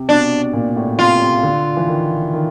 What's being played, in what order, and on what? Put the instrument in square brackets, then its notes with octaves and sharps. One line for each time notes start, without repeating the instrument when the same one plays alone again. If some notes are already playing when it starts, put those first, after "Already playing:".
Already playing: [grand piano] C3
[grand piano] B2 [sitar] D4
[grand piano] A#2
A2
[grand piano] C3 [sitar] F4
[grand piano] C3
D3
E3
D#3
D#3